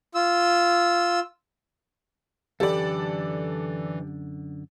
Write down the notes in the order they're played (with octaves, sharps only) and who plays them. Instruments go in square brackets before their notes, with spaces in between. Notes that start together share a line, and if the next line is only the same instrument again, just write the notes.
[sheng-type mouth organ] F4 E6
[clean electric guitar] F#2 D3 B5 [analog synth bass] E3 [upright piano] G4 [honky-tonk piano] A4 D5